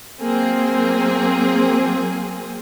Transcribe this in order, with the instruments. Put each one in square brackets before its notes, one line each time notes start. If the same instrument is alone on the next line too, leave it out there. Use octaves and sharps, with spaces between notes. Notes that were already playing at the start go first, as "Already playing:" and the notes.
[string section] F#3 A#3 C4 G#4